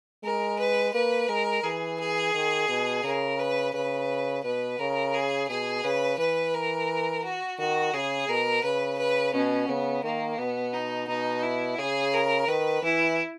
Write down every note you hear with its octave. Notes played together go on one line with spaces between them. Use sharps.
G#3 A#4
B4
A#3 B4
G#3 A#4
E3 G#4
G#4
D#3
B2
C#3 A#4
B4
C#3 B4
B2 B4
C#3 A#4
G#4
B2 G#4
C#3 B4
E3 B4
A#4
F#4
D#3 F#4
C#3 G#4
B2 A#4
C#3 B4
B4
B2 C#4
C#3 B3
D#3 A#3
B2 B3
D#4
B2 D#4
E4
C#3 G#4
A#4
D#3 B4
E3 E4